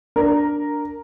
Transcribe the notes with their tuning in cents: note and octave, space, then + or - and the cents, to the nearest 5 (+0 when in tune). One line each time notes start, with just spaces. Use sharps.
D4 +0 A#4 +0